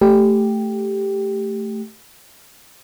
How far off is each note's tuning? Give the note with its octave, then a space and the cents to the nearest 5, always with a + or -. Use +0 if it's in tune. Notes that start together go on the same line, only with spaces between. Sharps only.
A3 +0 G4 +0